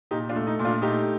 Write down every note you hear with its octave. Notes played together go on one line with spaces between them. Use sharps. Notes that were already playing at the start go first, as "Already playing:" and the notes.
A#2 D#4 G4
D4 F4
A3
D#4
A#2
D4 F4
A3 D#4 G4